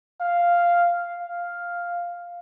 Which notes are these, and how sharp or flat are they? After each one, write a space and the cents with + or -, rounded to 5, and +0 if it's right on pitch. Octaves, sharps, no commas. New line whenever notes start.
F5 -5
F5 +0